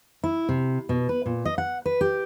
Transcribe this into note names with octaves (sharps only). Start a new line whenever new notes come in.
E4
C3
B2
B4
A#2
D#5
F#5
B4
G4